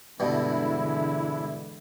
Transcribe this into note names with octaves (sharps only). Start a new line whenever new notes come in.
G2 B2 D3 E3 G#3 E4